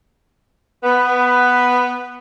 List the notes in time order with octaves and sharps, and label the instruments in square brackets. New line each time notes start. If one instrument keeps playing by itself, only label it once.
[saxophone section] B3 B4